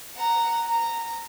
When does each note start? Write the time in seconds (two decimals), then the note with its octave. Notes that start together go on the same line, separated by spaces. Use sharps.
0.16 F#5 A#5
0.67 A#5